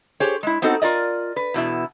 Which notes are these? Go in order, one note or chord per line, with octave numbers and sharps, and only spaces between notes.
G4 G#4 C5 C#5
G#3 E4
B3 C4 D#4 F#4 A4
F4 A#4 D5 D#5
B4
E2 B2 E4